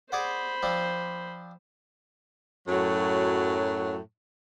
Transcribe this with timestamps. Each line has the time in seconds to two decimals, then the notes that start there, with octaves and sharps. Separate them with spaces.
0.12 G#4 C5 D5 F#5 B5
0.63 F3 C4 D4
2.68 F#2 A2 F#3